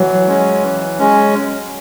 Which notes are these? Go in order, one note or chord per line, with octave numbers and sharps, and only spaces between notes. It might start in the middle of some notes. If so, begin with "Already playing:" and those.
Already playing: E3 F#3
G#3 C#4
E3
G#3 C#4